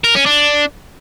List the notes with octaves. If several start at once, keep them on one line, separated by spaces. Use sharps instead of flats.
A#4
C#4
D4